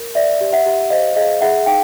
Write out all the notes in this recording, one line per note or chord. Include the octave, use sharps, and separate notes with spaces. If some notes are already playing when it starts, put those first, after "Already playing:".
Already playing: A#4
D5 E5
G4
E5 F#5
G4
C5 D#5 F5
G#4 D#5 F5
G#4 E5 F#5
D#4 F5 G5